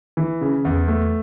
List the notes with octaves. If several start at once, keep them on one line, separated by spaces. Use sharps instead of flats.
E3
C#3
E2
A3